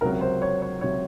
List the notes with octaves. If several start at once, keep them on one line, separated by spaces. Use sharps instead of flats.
C#2 C3 F#3 A#4
C5
C#5
C#5
C#2 C3 F#3 C#5